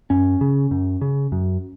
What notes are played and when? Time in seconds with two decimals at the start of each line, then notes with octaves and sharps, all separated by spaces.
0.10 F#2 C#4
0.41 C#3
0.71 F#2
1.01 C#3
1.32 F#2